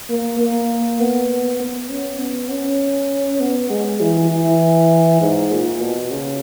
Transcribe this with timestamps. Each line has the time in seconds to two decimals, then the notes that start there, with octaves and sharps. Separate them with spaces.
0.09 A#3
0.39 A#3
1.00 B3
1.60 B3
1.89 C#4
2.19 B3
2.49 C#4
3.40 B3
3.70 G#3
4.00 E3
4.30 E3
5.20 G#2
5.51 A#2
5.81 B2
6.10 C#3